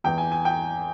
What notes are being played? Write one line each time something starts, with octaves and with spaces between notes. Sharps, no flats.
E2 E3 G5
G#5
G#5
G5